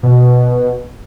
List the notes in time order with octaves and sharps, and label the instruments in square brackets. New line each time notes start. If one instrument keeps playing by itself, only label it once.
[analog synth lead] B2